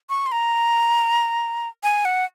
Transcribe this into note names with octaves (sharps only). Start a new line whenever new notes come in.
C#6
C6
A#5
G#5
F#5